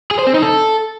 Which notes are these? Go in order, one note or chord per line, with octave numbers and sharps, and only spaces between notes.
G#4
C5
C4
D#4
A4